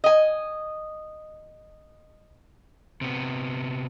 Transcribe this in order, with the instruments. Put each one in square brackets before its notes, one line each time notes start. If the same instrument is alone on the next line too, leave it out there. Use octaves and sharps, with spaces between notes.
[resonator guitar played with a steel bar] D#5 G#5
[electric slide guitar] C3 B3